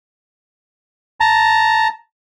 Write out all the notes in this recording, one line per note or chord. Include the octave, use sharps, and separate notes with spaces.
A5 A#5